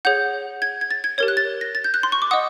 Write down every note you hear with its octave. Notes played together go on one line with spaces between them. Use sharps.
G#4 C#5 F#5 G6
G#6
G#6
A6
G#6
G4 A#4 C#5 G#6
F#6
A6
A#6
A6
G6
F#6
C6
C#6
D6
D#5 F#5 D#6